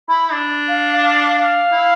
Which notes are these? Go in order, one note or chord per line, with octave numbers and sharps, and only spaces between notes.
E4 B5
D4
F5
F5
F5
E4